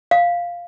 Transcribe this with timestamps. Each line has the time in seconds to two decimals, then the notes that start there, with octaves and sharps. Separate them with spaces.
0.11 F5